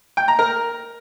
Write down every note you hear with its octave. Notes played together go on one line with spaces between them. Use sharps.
G5
A#5
A#4